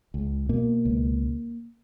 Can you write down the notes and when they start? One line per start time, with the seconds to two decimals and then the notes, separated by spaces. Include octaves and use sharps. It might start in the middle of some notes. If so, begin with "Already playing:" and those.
0.14 C#2
0.49 B2 A#3
0.85 C#2